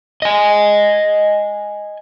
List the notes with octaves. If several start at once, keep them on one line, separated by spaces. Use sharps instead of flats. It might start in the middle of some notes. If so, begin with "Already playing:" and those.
D#5 G#5